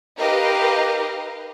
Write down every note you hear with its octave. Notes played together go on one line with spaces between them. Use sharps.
D#4 G4 A#4 B4 D#5 F5